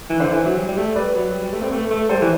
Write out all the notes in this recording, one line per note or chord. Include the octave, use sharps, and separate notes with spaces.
E3
D3 C5 E5
E3
F#3
G3
G3
A3
G3 B4 D5
F#3
G3
G3
A3
C4
A3
A3
G3 A4 C5
E3